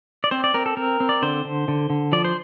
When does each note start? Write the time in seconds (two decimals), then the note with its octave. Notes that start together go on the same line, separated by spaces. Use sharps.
0.24 D5
0.31 C4 C5
0.44 D5
0.54 C4 A#4
0.66 A4
0.77 C4 A#4
1.00 C4
1.09 D5
1.22 D3 C5
1.45 D3
1.68 D3
1.90 D3
2.12 F3 D5
2.25 C5